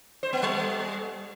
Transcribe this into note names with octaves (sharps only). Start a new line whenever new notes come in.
C5
B3
G3